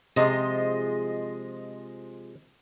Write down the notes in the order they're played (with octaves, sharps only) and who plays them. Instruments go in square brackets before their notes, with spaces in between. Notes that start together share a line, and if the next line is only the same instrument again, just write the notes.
[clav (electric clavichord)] C3 [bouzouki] F3 G#3 [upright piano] D#5